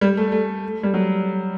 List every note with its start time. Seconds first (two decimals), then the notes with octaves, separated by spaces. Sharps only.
0.01 G3
0.17 A3
0.32 A3
0.83 G3
0.94 F#3